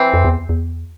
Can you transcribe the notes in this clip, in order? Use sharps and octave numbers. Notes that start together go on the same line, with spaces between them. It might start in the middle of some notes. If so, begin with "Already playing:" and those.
Already playing: E3 C4
F2
E2
E2